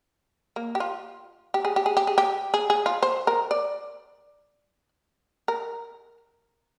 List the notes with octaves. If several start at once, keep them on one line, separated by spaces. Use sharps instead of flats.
A#3
G4
F4
G4
G#4
G4
G#4
G4
G#4
G4
G#4
G#4
F4
C5
A#4
D5
A#4